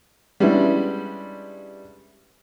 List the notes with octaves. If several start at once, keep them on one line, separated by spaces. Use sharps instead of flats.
G3 G#3 B3 C#4 D4 E4